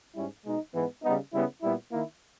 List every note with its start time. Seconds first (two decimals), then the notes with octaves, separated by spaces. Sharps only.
0.15 G#2 G3 C#4 E4
0.45 B2 G#3 D#4
0.74 G#2 E3 G#3 B3
1.03 C#3 G3 B3 D#4
1.33 C#3 G3 B3 E4
1.62 A#2 G3 B3 E4
1.92 D#3 A#3 E4